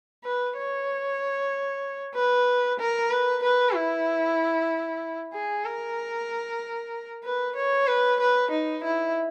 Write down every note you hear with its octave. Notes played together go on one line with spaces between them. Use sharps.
B4
C#5
B4
A#4
B4
B4
E4
G#4
A#4
B4
C#5
B4
B4
D#4
E4